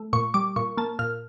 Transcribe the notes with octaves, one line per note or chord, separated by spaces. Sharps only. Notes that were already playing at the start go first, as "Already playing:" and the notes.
Already playing: A3
A#2 C#6
G3 D6
A#2 C#6
A#3 A5
A#2 F6